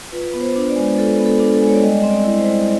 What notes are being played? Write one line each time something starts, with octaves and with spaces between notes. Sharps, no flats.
F4 B4
B3
C5
D4
D5
G#3
F4 A4
B3
A4
D4
A4
G#3
C#5
D5
G3 D#5
C4
D5
E4
C5
G3